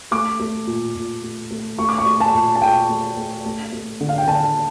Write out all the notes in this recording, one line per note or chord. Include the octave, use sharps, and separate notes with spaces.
A3 D6
A3
A#2
A#2
A3
A3
A3 C#6
D6
C#6
A3
A5
A#2
A5
A#2 G5
A3
A3
A3
A3
D3
F5
G5
D3 A5